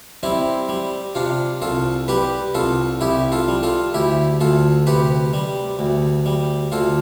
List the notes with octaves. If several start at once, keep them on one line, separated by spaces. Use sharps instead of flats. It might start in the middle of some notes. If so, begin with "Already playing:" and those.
G3 C4 E4
G3
C3 D4 F4
C2 F4 A4
G3 G4 B4
C2 F4 A4
C2 E4 G4
F4 A4
G3
F4 A4
D2 E4 G4
D2 F4 A4
C3 G4 B4
G3
D2
G3
D2 F4 A4